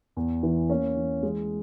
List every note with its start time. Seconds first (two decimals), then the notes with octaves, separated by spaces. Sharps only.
0.17 E2
0.43 E3
0.70 A#3 C#4
0.96 E3
1.23 G#3